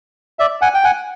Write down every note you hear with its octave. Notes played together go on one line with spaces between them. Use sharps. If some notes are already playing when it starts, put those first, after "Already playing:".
D5 E5
F#5 G#5
G5
F#5 G#5